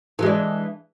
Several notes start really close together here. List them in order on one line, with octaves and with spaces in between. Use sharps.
E3 G#3 D4